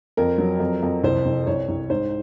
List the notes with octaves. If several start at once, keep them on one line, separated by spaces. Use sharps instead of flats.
F2 A#4
F#3
F2
F2
C2 C5
C2
C2 C#5
C2
G#2 C5